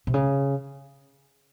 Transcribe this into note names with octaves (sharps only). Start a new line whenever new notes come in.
C3
C#3